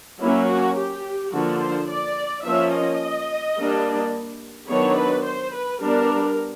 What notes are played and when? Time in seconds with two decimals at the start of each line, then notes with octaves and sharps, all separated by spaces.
0.20 F#3 A#3 C#4 E4
0.48 F#4
0.76 G4
1.32 D3 F3 A#3 D4 F#4
1.61 C5
1.88 D5
2.44 F3 A#3 C#4 E5
2.73 D#5
3.57 G3 A#3 D4
4.69 D#3 F#3 B3 D4 C#5
4.97 B4
5.26 C5
5.54 B4
5.81 G3 B3 D4 A#4